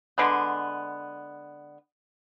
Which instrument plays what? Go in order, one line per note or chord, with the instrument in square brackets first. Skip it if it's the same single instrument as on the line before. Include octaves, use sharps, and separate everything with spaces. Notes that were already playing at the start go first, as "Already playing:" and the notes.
[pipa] D3 G#3 B3